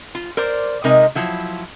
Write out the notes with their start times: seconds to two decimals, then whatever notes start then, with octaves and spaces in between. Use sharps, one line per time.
0.15 F4
0.37 A#4 C5 D5
0.84 C3 G#3 D#4 A#4 D#5
1.15 F3 F#3 E4